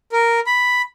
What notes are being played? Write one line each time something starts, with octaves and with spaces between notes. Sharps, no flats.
A#4
B5